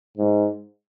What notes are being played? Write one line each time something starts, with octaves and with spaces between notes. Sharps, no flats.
G#2